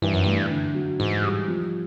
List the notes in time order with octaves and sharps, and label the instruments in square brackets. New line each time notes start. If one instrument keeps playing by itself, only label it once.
[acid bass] G2 [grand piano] E3
[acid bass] F#2
[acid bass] G2 [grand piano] A3
[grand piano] D3
F#3
[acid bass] G#2 [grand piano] E3
[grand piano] G3
F3